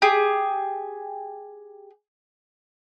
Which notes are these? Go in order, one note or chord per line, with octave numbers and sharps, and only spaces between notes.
G4 G#4